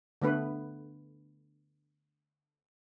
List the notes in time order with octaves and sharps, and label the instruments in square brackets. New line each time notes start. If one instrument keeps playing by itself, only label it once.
[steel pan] D3 A3 B3 B4